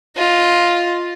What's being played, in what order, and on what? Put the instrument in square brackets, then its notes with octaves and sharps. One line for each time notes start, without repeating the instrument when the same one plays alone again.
[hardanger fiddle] F4 D#5